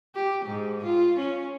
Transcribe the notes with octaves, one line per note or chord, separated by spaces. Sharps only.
G4
G#2
F4
C#4